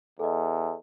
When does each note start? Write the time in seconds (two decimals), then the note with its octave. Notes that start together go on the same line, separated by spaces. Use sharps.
0.19 E2 A4 D#5